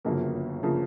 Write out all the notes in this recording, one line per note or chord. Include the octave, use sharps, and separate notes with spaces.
G1 F#2 C#3 F3 A#3
C#3 F3 A#3